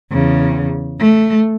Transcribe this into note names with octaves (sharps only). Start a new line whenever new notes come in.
E2 C#3
A3